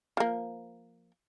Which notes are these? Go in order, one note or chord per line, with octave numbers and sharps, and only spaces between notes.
F3 A#3